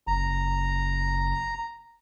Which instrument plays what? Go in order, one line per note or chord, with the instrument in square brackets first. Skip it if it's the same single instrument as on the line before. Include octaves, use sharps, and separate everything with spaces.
[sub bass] F#1 [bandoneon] A#5